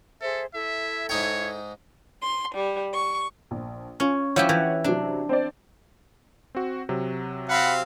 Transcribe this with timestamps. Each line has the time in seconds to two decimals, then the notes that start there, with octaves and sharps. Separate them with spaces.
0.21 G#4 A4 C5 E5
0.54 E4 A4 E5
1.09 G#2 D#4 C#5 G5
2.21 C6
2.54 G3
2.94 C#6
3.51 A#1
4.00 C#4 F4
4.36 F3 E4 G4 C#5 F#5
4.49 E3
4.84 C3 F#3 D4
5.29 C4 C5 D5
6.55 C4 F#4
6.89 C3 F#3
7.49 C4 F5 F#5 B5